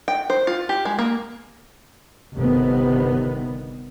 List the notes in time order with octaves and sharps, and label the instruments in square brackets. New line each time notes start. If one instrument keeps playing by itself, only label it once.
[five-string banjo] G5
C5
F4
G4
G#3
A#3
[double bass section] G1 C3 D#3 B3